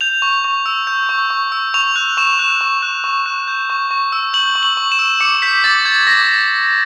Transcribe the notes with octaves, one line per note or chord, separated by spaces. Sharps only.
G6 F7
C#6
C#6
E6
G6
C#6
C#6
E6
C#6 F7
F#6
C#6 E7
F#6
C#6
F#6
C#6
F#6
G6
C#6
C#6
E6
G6 F#7
C#6
F#7
C#6
E7
E6
D6 C#7
G6 B6
D6 A6
G6 G#6
D6 A#6